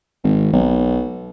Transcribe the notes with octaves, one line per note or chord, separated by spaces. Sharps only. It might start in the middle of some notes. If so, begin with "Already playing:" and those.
G#1
B1